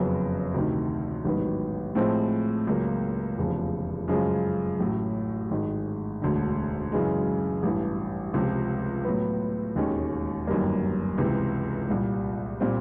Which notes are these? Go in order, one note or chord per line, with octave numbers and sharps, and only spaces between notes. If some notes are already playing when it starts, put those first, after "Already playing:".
Already playing: F#1 F2 C#3 F#3 B3
D2 C3 D#3
A1 G#2 D#3 F#3 B3
A2 F3 G#3 C4
C#2 C#3 F#3 A#3
F1 E2 C#3 F3
F#2 C#3 F3 G#3
A1 A2 F#3
G#1 G#2 D#3 G#3
E1 D2 D3
F#2 C#3 E3 G#3
A1 G2 E3
C#2 C3 F3
A2 F#3 B3
E1 D#2 D#3 G#3 C#4
G1 F#2 D#3 G3 A#3
C#2 C3 E3
C2 A#2 G3
A#2 G3 C4